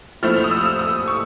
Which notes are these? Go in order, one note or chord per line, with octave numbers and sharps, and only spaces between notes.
F3 A3 C4 E4 F6
F6
D#6
E6
E6
D#6
C#6